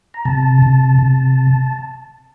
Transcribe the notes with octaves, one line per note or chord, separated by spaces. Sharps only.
A#5
C3 A5
C3
C3